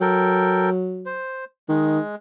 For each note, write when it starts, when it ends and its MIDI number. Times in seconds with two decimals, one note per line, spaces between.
0.01 1.20 54
0.01 0.70 69
0.01 0.70 70
0.01 0.70 79
1.06 1.45 72
1.69 1.99 51
1.69 2.15 56